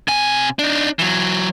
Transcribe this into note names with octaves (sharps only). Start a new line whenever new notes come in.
C3 G#5
D4 D#4
E3 F#3